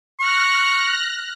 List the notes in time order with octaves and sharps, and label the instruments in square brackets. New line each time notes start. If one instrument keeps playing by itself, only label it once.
[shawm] C#6 [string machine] F6 F#6 A#6